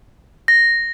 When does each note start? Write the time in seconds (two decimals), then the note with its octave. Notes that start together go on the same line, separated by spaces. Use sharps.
0.48 A#6